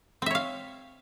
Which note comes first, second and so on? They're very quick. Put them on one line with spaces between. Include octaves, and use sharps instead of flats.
C4 E5 C#5 F5